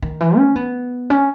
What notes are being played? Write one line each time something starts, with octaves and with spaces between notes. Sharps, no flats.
D#3
E3
C#4
B3
C#4